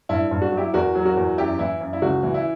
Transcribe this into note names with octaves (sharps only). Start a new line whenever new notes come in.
G2 E4
G2
F#4
F#3
E4 G4
E2 F#4 A#4
F#3
F#4 A#4
E2
F#2 E4 G4
E3 E4
F#2
E4
C#2 F#4
E3
E4